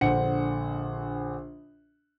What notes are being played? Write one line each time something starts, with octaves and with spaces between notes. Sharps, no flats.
A#1 D3 C5 F#5 C#7